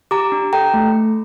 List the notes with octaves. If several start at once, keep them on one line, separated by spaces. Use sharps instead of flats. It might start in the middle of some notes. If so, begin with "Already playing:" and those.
G4 A#5 D6
D4
A4 G5 A#5
A3